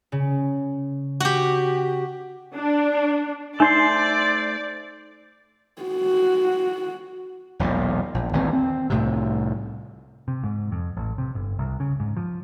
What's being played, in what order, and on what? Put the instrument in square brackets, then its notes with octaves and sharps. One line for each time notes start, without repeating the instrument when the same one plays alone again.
[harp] C#3
[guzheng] F#4 G4
[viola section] D4
[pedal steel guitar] A3 C5 C6 [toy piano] D#4 [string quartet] D5
[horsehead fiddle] F#4
[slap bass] E1 B1 A#2
A#1
G#1 D#2 E3 C4
C4
C2 A2 C3
[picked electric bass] C3
G#2
F2
A1
C3
G1
C2
C#3
G#2
F3